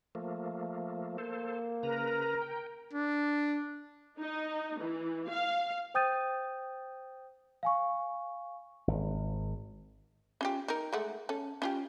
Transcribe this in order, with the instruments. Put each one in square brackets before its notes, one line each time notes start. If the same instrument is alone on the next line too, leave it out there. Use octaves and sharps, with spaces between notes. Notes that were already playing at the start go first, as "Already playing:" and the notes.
[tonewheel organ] F3 A3 A#3
[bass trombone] A#3 [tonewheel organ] A4 C5
[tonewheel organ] C#3 B4 A#5 [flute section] A#4
[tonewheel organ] G5
[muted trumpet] D4
[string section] D#4
E3
F5
[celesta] C5 G5 D#6 G6 A6 D#7
F5 G#5 C#6
[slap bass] G#1
[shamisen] C#4 F4 G4
D#4 A#4
G#3 A3 F#5
C#4 A4
C#4 F4 G4